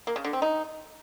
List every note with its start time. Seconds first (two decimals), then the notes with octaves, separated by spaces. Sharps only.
0.07 A#3
0.16 C#3
0.25 D3
0.33 C4
0.42 D#4